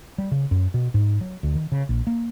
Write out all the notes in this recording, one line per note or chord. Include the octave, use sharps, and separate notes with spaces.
G3
C#3
F#2
B2
G#2
F#3
D2
D#3
C#3
A#1
A#3